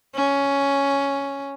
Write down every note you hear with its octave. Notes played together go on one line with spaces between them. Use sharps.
C#4